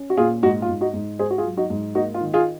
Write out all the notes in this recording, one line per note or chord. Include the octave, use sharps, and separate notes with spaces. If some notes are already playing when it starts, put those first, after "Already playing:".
Already playing: C#4
F#4
A#2 F4 G#4
G#2 D#4 F#4
F4
G#2
D#4 F#4
G#2
G#2 G#4 C5
F#4
F4 G#4
F#3
D#4 F#4
G#2
A#3 D#4 F#4
F4
D#3
F4 G#4